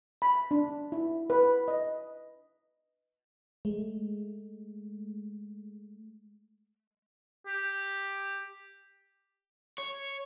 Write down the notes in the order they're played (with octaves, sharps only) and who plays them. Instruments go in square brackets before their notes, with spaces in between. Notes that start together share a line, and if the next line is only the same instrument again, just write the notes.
[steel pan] B5
D4
E4
B4
D#5
[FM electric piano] G#3 A3
[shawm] G4
[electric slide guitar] C#5